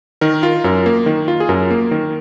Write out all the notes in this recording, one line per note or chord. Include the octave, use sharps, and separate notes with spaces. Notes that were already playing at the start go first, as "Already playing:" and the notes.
D#3 A#4
F4
F#2 A#4
A#3
D#3
F4
G#4
F#2 A#4
A#3
D#3 A#4